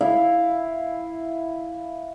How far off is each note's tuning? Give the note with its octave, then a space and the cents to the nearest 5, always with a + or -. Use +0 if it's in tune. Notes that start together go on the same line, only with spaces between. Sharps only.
E4 +0 F5 +0